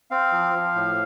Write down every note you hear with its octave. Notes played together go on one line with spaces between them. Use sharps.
C4 F5
F3
F3
A2